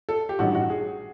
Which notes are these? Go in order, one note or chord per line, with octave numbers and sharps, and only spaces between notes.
A4
G4
A1 G2 D#3 F#4
F#4
G#4